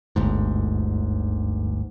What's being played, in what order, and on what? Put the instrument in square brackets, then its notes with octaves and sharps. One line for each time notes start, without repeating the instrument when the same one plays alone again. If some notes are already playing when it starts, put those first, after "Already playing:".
[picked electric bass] G1 D2 G#2